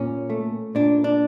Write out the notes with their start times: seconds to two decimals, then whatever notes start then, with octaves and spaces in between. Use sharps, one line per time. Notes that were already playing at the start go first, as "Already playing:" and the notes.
Already playing: A#2 C#4
0.30 A3
0.75 A#2 D4
1.04 D4